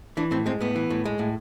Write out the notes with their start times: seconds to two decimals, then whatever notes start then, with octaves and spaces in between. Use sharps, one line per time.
0.17 E3 D4
0.31 A2 C4
0.46 G#3 C4
0.60 A2 B3
0.76 E3
0.90 A2
1.05 G#3
1.19 A2